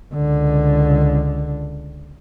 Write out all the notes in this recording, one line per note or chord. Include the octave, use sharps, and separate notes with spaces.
C#2 D3